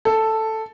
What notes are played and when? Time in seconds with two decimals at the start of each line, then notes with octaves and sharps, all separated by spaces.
0.05 A4